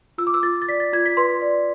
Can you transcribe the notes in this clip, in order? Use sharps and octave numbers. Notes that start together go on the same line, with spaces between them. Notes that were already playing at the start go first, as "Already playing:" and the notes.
F4 E6
D6
E6
F4 A6
A6
D5 B6
A6
F4 G#6
B6
B4 C6
D5